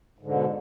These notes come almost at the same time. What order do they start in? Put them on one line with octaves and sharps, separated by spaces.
G#2 D3 B2